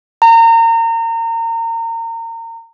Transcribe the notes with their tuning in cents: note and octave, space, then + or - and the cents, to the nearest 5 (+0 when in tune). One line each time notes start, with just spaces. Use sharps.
A#5 -30